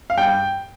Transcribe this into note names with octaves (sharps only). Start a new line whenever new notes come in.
F5
G2 G5